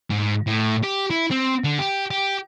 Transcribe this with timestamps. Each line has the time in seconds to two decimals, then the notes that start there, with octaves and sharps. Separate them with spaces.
0.10 G#2
0.47 A2
0.83 G4
1.10 E4
1.31 C4
1.64 D3
1.79 G4
2.11 G4